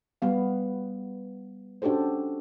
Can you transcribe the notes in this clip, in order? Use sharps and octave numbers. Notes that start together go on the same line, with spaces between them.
G3 B3 F5
C#4 D4 F#4 G4 A4 C5